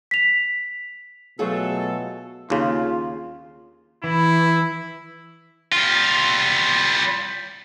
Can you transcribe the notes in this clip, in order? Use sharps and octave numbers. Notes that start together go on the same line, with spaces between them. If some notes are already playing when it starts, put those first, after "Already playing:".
B6 F7
B2 F#3 A3 F4 G#4 A4 C#5
D#2 C#3 F4
E3 E4
G3 F4